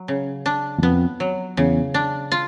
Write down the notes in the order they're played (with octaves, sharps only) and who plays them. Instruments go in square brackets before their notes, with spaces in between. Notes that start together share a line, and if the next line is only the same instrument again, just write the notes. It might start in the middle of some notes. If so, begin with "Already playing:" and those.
Already playing: [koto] F#3
C#3
D4
[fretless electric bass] E2
[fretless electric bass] F2 [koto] B3
[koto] F#3
[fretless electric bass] E2 [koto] C#3
[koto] D4
F4